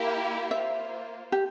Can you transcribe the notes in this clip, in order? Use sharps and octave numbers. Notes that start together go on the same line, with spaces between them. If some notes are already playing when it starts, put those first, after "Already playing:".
Already playing: A#3 E4 G4 A#4
A#3 F4 C5 E5
G4